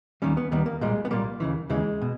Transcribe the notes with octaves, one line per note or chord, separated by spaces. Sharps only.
D#2 D#3 G3 C#4
B3
D#2 D#3 G3 B3
A#3
B1 A#2 G3 G#3
B3
B1 A#2 G3 A#3
D#2 C#3 E3
D#2 C#3 E3 G#3
B2